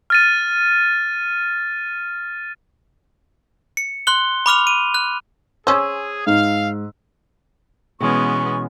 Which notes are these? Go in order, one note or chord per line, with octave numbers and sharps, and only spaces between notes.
F6 A6 D#7
C#7
C6 F#6 G7
B5 D6 F6 F7
D#7
F#6
C#4 G#4 C5 E6
G#2 F5
B2 E3 G#3 B3 C#4 C#6